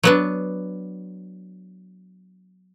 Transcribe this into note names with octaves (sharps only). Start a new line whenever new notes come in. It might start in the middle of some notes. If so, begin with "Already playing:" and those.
F#3 B3 D4